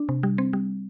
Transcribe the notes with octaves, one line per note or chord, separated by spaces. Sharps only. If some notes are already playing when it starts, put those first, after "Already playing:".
Already playing: D4
C3
G3
C4
G3